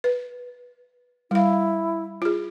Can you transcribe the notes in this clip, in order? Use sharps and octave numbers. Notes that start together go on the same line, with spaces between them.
B4
G3 E4 F5
F4 G#4